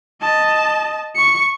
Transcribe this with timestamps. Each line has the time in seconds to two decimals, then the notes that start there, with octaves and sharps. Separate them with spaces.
0.21 D#5 A5
1.15 C#6 C#7